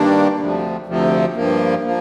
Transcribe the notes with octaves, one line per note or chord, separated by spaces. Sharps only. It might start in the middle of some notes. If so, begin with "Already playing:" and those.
Already playing: G2 D#3 G3 A#3 D4
D2 C3 F3
D2 C3 F3
G2 F3 A#3
F3 A#3